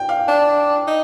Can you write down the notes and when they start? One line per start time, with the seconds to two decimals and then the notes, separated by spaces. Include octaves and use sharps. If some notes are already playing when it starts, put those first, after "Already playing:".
Already playing: G5
0.09 F5
0.28 D4
0.87 D#4